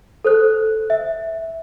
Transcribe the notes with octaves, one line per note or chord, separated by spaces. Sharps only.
A4 C5 F#6
E5